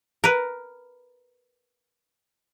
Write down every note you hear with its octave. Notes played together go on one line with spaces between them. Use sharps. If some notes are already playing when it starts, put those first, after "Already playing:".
A#4 B4